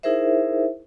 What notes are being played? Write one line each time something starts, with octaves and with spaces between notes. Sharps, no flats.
D#4 E4 G#4 A#4 C5 E5